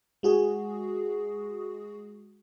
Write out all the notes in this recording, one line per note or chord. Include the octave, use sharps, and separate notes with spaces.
G#3 F#4 G#4